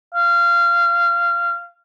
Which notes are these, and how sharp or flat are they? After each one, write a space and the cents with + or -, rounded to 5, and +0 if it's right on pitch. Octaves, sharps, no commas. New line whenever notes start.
F5 -20